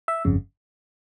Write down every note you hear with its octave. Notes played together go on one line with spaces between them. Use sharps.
E5
G1 F2 C#3